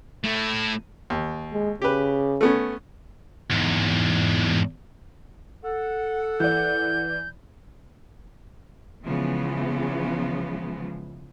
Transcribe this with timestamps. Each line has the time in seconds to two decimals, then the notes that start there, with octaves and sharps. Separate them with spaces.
0.24 A3 E4
1.10 D#2
1.53 G#3
1.82 C#3 G4 B4
2.41 A3 B3 C#4
3.51 E2 G#2
5.64 A4 F#5
6.40 E3 D5 G6
9.04 C#3 E3 F3 G#3 B3